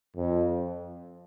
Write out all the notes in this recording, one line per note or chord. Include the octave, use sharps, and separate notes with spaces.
F2